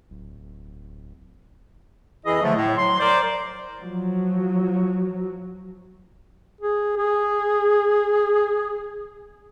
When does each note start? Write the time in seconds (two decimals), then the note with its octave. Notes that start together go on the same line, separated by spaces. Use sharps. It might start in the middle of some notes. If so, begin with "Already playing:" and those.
0.10 D1
2.26 F2 E3 E4 G#4 D#5
2.41 D3 F3 F#3 A3
2.56 A2
2.78 F#3 C6
2.99 A#4 C5 D5
3.80 F3 F#3
6.61 G#4
6.97 G#4